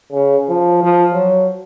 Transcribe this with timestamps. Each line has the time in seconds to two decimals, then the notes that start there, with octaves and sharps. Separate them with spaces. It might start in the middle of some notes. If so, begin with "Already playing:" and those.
0.12 C#3
0.49 F3
0.83 F3
1.14 F#3